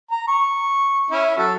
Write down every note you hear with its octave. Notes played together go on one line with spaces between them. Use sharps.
A#5
C#6
C#4 E4
F#3 F#4 A4